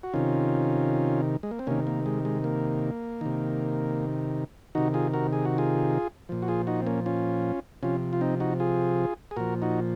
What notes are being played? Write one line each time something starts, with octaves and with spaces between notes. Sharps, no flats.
F#4
C3 D#3 C#4 F4
G#3
A#3
C4
C3 D#3 A#3 C#4
A#3
G#3
G#3
A#3
C3 D#3
C3 D#3 D#4 F#4
F4 G#4
F#4 A#4
G#4
F#4
F4 G#4
A#2 F3
F#4
F4 G#4
D#4 F#4
C4
A#3 C#4
C#4 F4
C3 F3 C#4 F4
F4
C4 D#4
D#4 F#4
F4 G#4
G#4
A#2 F3 F#4 A#4
D#4 F#4